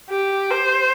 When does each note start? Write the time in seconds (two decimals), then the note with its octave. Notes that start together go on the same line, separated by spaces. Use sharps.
0.10 G4
0.51 C5